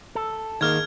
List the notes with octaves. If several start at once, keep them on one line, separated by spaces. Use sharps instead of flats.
A4
G#2 D#3 A#3 F6 G#6